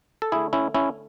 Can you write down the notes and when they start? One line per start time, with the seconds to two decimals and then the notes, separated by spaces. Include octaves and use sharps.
0.22 A4
0.32 D3 A3 E4 G#4
0.53 C#4 E4
0.75 C#4 E4